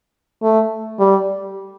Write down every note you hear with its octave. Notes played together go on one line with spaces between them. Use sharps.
A3
G3